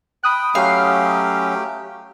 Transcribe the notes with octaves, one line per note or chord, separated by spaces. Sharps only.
G5 B5 D#6 F#6
F#3 A3 C#4 G4 F5